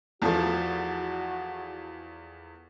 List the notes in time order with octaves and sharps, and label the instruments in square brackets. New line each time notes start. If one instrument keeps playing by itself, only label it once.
[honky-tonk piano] E2 F3 A3 [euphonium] F#4